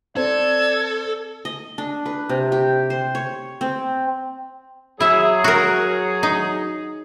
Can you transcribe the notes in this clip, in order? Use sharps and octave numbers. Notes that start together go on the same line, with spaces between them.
C4 A4 D5 G#6
D#5
D4
B4
C3
G4
C5
C#5
C4
F#3 E4 G#4 E5
F#4 A#4
D#4